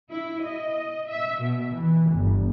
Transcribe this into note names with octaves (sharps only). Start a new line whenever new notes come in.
E4
D#5
E5
B2
E3
G1